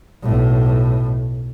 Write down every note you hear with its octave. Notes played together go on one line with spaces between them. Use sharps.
B1 A2